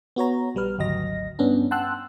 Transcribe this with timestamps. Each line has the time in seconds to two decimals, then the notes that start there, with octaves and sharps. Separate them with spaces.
0.16 B3 F#4 C#5 A#5
0.55 A#1 G3 B4 F6
0.78 G#1 D2 F#3 D#5 A#6
1.39 G2 B3 C#4 D4
1.71 F#5 G5 A5 C6 E6 F#6